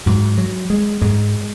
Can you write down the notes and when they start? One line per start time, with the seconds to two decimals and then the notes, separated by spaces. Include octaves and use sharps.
0.06 G#2 F#3
0.38 F#3
0.70 G#3
1.01 G#2 G#3